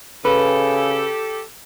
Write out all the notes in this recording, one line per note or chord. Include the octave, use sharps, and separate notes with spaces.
C#3 G4 A4 B4